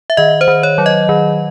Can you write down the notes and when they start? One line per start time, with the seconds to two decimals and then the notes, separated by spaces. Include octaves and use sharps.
0.10 E5
0.17 D#3 D#5
0.41 C5
0.48 D#3
0.63 C#5
0.78 F#3
0.86 D#5
1.09 D#3